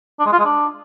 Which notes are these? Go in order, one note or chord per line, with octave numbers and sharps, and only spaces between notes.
D4
G#3
F4
G#3
D4